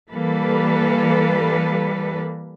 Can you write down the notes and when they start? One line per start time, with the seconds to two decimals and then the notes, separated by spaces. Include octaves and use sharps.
0.12 E3 G3 A#3 A4 B4